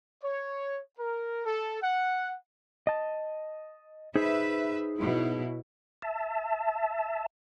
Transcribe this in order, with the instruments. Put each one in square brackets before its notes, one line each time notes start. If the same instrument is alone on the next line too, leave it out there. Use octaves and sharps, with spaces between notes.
[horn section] C#5
A#4
A4
F#5
[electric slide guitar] D#5 A5
[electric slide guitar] D#4 G#4 C5 [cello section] B4 E5
[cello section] B2 F#3 E4
[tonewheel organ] E5 A5